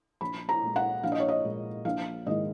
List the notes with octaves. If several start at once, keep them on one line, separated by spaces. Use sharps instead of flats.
A#1 B5
A#5
A#2 G#3
F#5
A#1 F5
D#5
C#5
D#5
A#2 G#3
A#1 F5
G#2 D#3 G#3 D#4 D#5